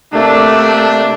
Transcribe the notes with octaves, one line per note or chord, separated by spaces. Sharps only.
C3 A3 A#3 D4